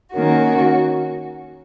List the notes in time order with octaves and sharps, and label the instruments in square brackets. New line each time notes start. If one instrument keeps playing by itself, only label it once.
[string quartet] D#3 A#3 C#4 F#4